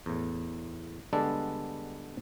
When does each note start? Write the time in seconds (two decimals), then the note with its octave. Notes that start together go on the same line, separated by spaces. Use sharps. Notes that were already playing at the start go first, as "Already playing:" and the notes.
0.06 E2 A2
1.13 D3 G3 G#3 B3 D4 A4